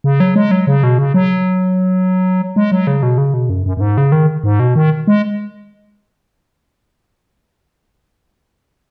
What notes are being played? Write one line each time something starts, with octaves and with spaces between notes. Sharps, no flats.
C#3
F#3
G#3
F#3
C#3
B2
C#3
F#3
G#3
F#3
C#3
B2
C#3
B2
F#2
F#2
F#2
G#2
C#3
D#3
G#2
B2
D#3
G#3